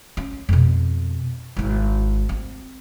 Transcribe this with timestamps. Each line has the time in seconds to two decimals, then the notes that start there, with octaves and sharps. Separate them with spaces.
0.17 C#4
0.49 F2 B2
1.57 G#1 E4
2.29 C4